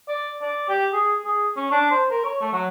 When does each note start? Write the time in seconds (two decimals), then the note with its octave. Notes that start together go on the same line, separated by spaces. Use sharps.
0.08 D5
0.42 D5
0.69 G4
0.93 G#4
1.25 G#4
1.57 C#4
1.71 D4
1.91 C5
2.11 A#4
2.25 C#5
2.41 A3
2.53 F#3